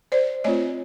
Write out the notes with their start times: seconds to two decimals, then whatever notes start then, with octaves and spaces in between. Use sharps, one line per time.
0.12 C5 D5
0.44 A3 C4 F4 C#5 D#5